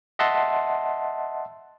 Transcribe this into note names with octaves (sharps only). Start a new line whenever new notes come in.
D#5 E5 F#5 A5 C6